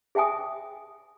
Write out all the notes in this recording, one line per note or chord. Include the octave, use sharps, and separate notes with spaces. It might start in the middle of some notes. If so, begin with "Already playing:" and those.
G#4 E5 G5 G#5 D#6